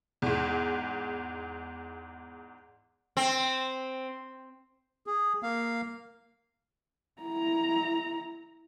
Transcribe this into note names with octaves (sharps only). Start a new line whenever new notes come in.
E2 G#2
C4
G#4
A#3 F5
E4 A#5